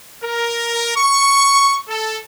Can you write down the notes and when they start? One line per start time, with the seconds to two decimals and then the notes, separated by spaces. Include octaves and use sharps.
0.23 A#4
0.95 C#6
1.88 A4